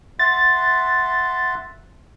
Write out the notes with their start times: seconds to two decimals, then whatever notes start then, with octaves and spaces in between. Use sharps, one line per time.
0.19 E5 F#5 C6 A6